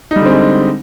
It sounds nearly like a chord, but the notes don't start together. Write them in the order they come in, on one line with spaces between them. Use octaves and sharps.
D#4 G3 D3 C4 G#3